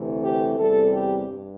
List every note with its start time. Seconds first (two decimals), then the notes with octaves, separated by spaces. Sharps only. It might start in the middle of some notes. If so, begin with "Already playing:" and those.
Already playing: D2 C3 E3 A3
0.23 G4
0.58 E2 C3 G3 A4
0.92 G4
1.27 G2